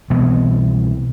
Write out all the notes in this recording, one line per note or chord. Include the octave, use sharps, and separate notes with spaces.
C2 B2 E3 B3